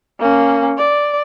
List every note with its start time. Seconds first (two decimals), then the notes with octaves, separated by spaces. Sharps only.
0.20 A#3 C#4
0.78 D5